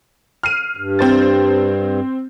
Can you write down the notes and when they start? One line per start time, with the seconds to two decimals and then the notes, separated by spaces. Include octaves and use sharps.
0.43 F6 C7 D#7
0.77 G2
0.99 C4 C5 A6